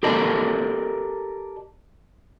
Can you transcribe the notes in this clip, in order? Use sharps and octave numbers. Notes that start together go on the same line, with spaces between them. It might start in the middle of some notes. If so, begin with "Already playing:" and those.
G4 A4 A#4 D5 D#5 A5